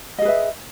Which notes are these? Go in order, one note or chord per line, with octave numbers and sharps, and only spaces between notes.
G#4 B4 D#5 E5